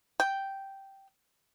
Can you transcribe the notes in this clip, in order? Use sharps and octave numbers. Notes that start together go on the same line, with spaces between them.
G5